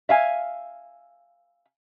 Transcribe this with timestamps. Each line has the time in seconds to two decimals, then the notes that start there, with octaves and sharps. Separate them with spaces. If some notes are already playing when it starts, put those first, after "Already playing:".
0.09 E5 F5 G#5